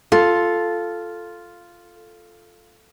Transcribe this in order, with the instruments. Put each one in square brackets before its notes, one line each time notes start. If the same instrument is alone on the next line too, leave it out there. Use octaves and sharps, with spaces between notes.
[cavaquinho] F4 [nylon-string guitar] A4